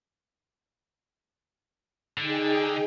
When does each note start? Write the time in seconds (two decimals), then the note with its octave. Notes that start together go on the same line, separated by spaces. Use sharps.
2.18 D3 D#4 G#4 G5